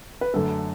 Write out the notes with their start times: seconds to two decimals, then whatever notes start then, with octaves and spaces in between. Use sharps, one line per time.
0.21 B4
0.34 F#2 D3 A3 A4